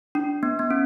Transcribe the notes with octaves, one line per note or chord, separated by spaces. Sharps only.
D4
B3
B3
C#4